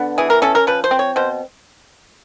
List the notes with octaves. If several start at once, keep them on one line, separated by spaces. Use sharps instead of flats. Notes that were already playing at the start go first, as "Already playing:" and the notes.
Already playing: D3 B3
E3 G#4
A#4
C#4 A4
A#4
F3 B4
C5
C4
C#5
B2 C5